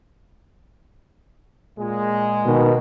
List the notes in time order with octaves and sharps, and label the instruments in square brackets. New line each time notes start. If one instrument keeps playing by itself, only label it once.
[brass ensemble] A#2 G#3
[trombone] B2 [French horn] D#3